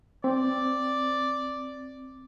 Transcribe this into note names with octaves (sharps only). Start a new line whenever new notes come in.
C4 D5